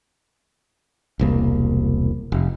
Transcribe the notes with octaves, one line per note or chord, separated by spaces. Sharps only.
E1 C2 A#3
F1